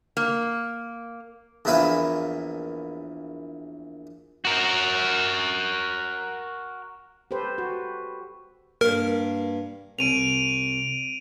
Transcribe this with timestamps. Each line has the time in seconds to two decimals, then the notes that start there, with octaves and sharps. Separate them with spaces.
0.17 A#3
1.65 A#1 E2 A#3 E4 B4 B5
4.45 F#4 A#4
7.31 G4 A4 B4 C5
7.58 F#4
8.81 G2 A#3 A#4
9.99 C2 D7 D#7 F7